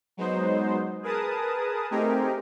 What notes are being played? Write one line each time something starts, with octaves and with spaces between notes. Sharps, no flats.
F#3 G#3 B3 D#4 C5
G#4 A#4 B4 A5 D#6
A3 C4 D#4 G4 G#4 A#4